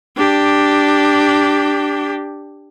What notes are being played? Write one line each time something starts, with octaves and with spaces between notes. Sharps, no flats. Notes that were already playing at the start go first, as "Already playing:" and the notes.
D4 G4